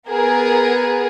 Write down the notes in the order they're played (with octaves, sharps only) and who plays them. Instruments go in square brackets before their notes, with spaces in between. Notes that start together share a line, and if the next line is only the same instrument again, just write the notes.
[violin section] B3 G#4 A#4